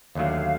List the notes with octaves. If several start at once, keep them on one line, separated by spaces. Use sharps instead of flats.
D#2 D3 F#3 A3 F5